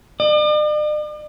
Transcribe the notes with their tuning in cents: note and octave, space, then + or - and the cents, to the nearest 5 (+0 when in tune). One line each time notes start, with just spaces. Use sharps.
D5 +45